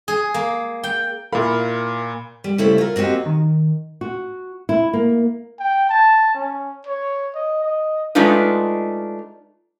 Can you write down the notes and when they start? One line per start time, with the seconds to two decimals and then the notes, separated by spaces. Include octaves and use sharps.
0.08 G#4
0.34 A#3
0.84 G5
1.32 A#2 E4 A#4 F5 B5
2.44 G3
2.58 C#3 G3 A3 E4 A4 C5
2.78 F4 A#4
2.96 A#3 C4 F#4 G4 D#5
3.26 D#3
4.01 F#4
4.69 E4
4.93 A#3
5.59 G5
5.90 A5
6.35 C#4
6.87 C#5
7.35 D#5
7.64 D#5
8.15 G#3 A3 D4 D#4 F4 B4